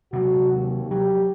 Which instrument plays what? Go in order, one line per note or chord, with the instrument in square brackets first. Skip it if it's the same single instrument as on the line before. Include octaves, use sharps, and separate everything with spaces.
[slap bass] C3 F#3 [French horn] F#4
[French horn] D#2
[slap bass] F#3 [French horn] G4